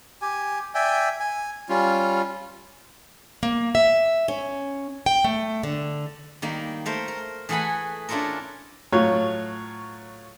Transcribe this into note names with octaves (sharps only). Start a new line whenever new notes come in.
G4 G#5
D5 E5 G5 G#5
G#5
G3 C#4 F4
A#3
E5
C#4
G5
A3
D3
D#3 G3 A#3
A3 A#4 C5
A#4
E3 A3 G#4 F#5 G#5 B5
C#4 D4 E4 F4 A4 A#4
A2 F#3 F4 C#5